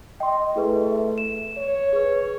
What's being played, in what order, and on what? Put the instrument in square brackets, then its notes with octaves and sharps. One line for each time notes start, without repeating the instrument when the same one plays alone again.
[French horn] D#5 [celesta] G5 C6
[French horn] A3 [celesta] E4 G#4 B4
[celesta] B4 E5
E7
[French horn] C#5
[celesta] G#4 B4